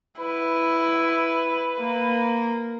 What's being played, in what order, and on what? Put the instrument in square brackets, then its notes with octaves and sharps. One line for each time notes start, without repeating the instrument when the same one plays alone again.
[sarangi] E4 [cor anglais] B4
[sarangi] A#3